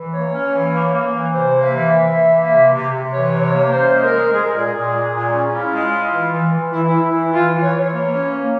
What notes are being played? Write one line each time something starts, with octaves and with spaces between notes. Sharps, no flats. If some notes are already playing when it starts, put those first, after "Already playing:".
Already playing: E3
A#3 C#5
C#4
E3
A#3
A#3
E3
C3 C5
A#3
E5
E3
E3
E3
A#3
C3
C3
C3
E3 C#5
C3
C#5
A#3
C#4 C5
G#3
A#4
G#3
G#3 G#4
A#4
A#2 G#4
A#2
G#3
A#2
C#4
E4 F4
G#3
E4
E3
E3
E3
E3 E4
E4
E3
E4
E3
E3 F4
E3
C#5
E3 C#5
A#3
C#4
A#3